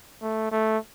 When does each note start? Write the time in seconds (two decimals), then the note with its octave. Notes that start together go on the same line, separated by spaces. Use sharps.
0.22 A3
0.52 A3